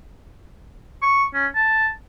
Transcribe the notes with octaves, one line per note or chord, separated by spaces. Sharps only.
C#6
C#4
A5